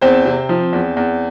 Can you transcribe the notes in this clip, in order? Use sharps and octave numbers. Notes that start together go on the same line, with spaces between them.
E2 C4 C5
C3
F3
E2
E2